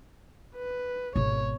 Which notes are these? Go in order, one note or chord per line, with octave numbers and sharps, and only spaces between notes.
B4
G#1 B2 C#5